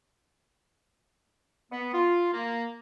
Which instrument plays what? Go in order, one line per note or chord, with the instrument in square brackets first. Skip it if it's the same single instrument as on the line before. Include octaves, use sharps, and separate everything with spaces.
[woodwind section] B3
F4
A#3